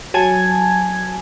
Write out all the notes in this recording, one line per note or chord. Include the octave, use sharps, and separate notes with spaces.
F#3 G#5 A5 G#6